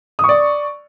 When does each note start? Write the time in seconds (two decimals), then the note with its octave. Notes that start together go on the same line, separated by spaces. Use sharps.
0.19 D#6
0.24 C#6
0.29 D5